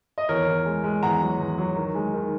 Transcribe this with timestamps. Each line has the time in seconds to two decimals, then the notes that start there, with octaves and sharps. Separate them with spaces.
0.18 D#5
0.29 E2 A#4 C#5
0.47 E2
0.66 G#3
0.84 G#3
1.03 E2 F#5 A#5
1.21 F#3
1.40 E2
1.58 F#3
1.76 D#3
1.95 G#3
2.14 D#3